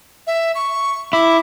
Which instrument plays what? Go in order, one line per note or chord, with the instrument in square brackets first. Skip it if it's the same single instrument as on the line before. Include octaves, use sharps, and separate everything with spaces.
[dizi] E5
C#6
[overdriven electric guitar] E4 [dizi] D6